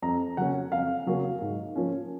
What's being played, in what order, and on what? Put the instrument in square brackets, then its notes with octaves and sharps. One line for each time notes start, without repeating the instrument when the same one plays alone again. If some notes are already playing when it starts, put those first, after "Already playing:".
[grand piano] F2 A#5
C#3 F#3 A#3 C#4 F#5
F2 F5
C#3 F#3 A#3 C#4
G#2
F3 A#3 C#4